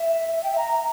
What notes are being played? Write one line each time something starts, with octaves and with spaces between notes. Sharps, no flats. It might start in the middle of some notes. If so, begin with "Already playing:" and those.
Already playing: E5
E5
G5
E5
A#5